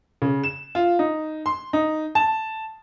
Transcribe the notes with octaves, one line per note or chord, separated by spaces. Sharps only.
C#3
E7
F4
D#4
C6
D#4
A5